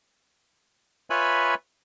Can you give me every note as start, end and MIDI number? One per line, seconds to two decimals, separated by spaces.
1.10 1.54 65
1.10 1.54 71
1.10 1.54 73
1.10 1.54 76
1.10 1.54 80
1.10 1.54 83